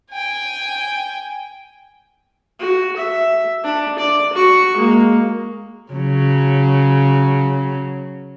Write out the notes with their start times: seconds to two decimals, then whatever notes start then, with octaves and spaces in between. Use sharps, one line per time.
0.12 G5 G#5
2.59 F#4
2.96 E5
3.64 D4
3.99 D5
4.33 F#4 C#6
4.77 G#3 A#3
5.92 C#3 F#3